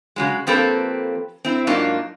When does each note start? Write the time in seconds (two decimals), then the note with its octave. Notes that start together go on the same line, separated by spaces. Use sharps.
0.16 C#3 F#3 G#3
0.47 F3 A#3 C4 G4 A4 B4
1.45 C4 E4
1.67 G#2 F#3 A#3 D4 D#4 F4